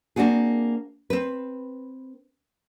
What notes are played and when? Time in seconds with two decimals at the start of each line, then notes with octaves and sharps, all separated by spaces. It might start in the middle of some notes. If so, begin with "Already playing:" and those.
0.16 A#3 C4 D4 F#4 G#4
1.10 C4 B4